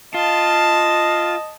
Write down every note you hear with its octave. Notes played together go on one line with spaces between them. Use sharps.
F4 D#5 A5